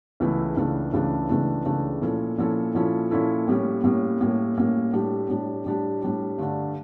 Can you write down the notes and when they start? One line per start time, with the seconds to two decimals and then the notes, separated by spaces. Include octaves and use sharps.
0.20 C#2 C#3 E3 A3 E4
0.57 C#2 C#3 E3 A3 D4
0.93 C#2 C#3 E3 A3 D4
1.29 C#2 C#3 E3 A3 D4
1.65 C#2 C#3 E3 A3 D4
2.02 A#2 F3 C#4 E4 A4
2.38 A#2 F3 C#4 E4 A4
2.75 A#2 F3 C#4 E4 A4
3.11 A#2 F3 C#4 E4 A4
3.47 A2 G3 A#3 C#4
3.84 A2 G3 A#3 C#4
4.20 A2 G3 A#3 C#4
4.57 A2 G3 A#3 C#4
4.93 A2 G3 D4 G4
5.29 A2 G3 D4 G4
5.65 A2 G3 D4 G4
6.02 A2 G3 D4 G4
6.38 G2 D3 A3 D4